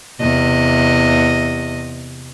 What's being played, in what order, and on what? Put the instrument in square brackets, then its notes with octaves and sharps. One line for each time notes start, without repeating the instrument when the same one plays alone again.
[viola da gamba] E2 C3 D#5